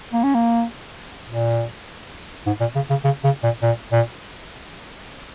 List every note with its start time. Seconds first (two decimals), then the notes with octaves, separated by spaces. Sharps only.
0.13 A#3
0.23 C#4
0.35 A#3
1.29 A#2
2.46 G#2
2.60 A#2
2.75 C#3
2.90 C#3
3.04 C#3
3.24 C#3
3.43 A#2
3.62 A#2
3.92 A#2